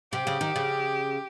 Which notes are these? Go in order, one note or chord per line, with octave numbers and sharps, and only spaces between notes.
C3 G4
C#3
D#3
C#3